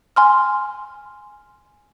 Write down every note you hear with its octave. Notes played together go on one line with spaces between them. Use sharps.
G#5 C6 F6